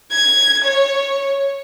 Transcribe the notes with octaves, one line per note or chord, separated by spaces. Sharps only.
G#6
C#5